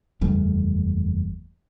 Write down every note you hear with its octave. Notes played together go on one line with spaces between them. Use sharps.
F#1 E2 G3 A3